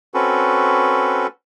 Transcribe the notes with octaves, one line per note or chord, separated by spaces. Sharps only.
C4 C#4 F#4 A4 B4